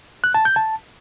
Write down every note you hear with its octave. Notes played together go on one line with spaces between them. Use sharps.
F#6
A5
G6
A5